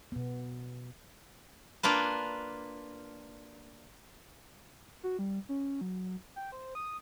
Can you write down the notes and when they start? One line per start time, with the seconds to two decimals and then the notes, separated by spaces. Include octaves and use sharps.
0.12 B2 B3
1.83 A#3 D4 F4 B4
5.03 F#4
5.19 G3
5.49 C#4
5.81 F#3
6.36 G5
6.52 C5
6.75 D#6